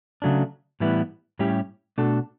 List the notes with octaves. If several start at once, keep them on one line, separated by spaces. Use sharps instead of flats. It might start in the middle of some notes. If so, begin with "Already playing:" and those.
C#3 F#3 A3 D4
A2 E3 G3 B3 E4
A2 G3 C#4 E4 G4
B2 A3 D4 F#4 A4